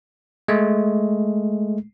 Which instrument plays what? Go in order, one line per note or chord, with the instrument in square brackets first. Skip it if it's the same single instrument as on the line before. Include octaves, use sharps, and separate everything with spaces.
[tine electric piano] G#3 A3